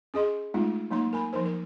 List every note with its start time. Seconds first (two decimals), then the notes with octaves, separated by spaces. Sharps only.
0.14 C#4 G#4 D#5 C6
0.54 G#3 A3 B3 D#4 F4
0.91 F#3 A#3 D#4 C6
1.13 A#4 G#5 B5
1.33 F3 D#4 A#4 C5
1.45 A#4